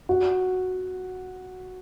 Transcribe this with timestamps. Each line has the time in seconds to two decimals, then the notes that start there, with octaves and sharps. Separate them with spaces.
0.09 F#4